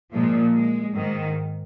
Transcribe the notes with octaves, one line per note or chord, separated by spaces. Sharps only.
A#2 F3 G#3
G#3
G#2 D#3